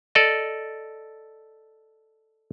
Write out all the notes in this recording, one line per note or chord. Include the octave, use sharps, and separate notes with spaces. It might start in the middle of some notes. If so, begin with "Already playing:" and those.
A4 D5 D#5